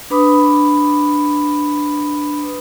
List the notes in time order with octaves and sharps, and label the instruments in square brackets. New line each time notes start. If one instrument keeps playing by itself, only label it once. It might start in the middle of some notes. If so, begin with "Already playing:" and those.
[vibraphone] D4 B4 B5 D6 D#6